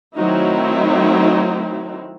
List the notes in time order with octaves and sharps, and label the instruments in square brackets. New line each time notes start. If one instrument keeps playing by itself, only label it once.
[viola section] D#3 F#3 A3 C4 D#4 E4